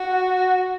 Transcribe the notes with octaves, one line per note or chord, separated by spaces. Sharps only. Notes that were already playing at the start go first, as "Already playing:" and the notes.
Already playing: F#4